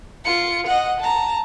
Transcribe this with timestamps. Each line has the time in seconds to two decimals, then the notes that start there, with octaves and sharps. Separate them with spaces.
0.25 F4 C#7
0.66 D#5 F#5
1.00 A5 A#5